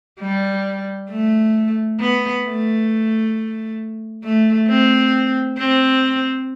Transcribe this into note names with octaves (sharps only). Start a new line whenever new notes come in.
G3
A3
B3
A3
A3
C4
C4